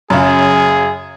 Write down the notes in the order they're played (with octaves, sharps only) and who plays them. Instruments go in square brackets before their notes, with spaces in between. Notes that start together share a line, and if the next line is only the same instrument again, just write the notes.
[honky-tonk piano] F#2 C#3 [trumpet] G#4